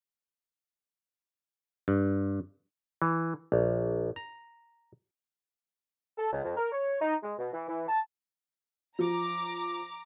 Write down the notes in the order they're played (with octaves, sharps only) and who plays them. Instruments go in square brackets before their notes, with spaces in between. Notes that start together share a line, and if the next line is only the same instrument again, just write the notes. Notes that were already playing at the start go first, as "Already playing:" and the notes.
[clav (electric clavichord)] G2
E3
A#1
A#5
[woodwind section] A4
C#2
F2
A#4
C#5
D#4
G#3
B2
E3
E3
A5
[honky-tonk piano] F3 [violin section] A#5 D6